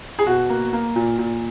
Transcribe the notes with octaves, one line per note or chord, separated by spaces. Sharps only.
G#4
B2 F#4
A#3
A#3
A#2
A#2